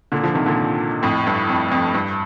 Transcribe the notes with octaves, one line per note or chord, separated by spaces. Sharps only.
A#2 D3
D3 F3
C3 D#3
A#2 D3
F2 A2
G2
F2
F2
G2